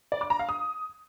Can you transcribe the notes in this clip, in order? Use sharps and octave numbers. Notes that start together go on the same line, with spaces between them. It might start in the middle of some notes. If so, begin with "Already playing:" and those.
D5
D6
A#5
F5
D#6